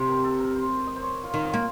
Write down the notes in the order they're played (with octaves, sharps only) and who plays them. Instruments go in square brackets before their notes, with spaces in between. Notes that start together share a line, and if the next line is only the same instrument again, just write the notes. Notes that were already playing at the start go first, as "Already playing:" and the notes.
Already playing: [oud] C3 [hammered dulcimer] C5
[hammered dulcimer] A#4
A4
A#4
C5
D#5
C5
C#5
F4
[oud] D#3
[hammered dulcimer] C4
[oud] A#3